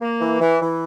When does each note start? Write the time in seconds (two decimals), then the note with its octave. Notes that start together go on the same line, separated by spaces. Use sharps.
0.01 A#3
0.20 E3
0.40 E3
0.61 E3